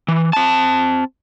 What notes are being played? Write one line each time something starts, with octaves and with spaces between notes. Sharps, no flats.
E3
C4 A5